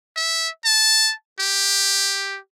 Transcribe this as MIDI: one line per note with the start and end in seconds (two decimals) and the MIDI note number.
0.16 0.49 76
0.65 1.12 81
1.40 2.39 67